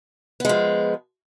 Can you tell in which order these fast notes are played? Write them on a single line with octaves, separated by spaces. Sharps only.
B3 G#3 F3